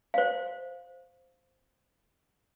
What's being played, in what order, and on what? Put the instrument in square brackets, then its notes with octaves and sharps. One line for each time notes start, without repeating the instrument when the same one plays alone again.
[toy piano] C5 F5